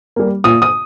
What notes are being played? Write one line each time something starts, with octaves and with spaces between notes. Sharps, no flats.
G3 A#3
A#2 D#6
D#6